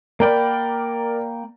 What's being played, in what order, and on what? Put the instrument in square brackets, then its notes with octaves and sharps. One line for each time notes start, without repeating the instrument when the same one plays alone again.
[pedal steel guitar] A#3 G5 B5 [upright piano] A#4 D5